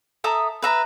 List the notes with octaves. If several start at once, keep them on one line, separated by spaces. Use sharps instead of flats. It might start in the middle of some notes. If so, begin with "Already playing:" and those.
A4 E5 A#5 D#6
B4 E5 A#5